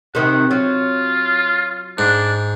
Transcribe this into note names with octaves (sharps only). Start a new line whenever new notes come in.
C3 D#3 F#5
F#3 F4
G#2 D4